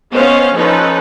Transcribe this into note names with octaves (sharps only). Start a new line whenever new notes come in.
B3 C#4 C5 D#5 F5
F3 C#4 D#4 A4 B4